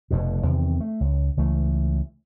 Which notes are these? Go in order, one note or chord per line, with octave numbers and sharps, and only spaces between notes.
F1 F2 B2
E2 C3 D#3 C4
A3
C#2
C#2 E3 A3